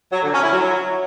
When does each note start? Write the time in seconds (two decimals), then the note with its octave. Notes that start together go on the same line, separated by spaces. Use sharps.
0.12 F#3
0.22 D3
0.32 C#4
0.42 E4
0.52 F#3